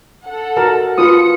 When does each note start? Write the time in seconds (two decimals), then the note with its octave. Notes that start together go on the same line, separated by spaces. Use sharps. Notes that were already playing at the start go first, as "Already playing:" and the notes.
0.24 A4 F#5
0.57 F#4 A#4 A5
0.98 F4 B4 D#6 C#7